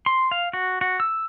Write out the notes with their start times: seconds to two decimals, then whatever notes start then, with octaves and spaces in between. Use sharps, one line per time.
0.06 C6
0.31 F5
0.53 F#4
0.81 F#4
1.00 E6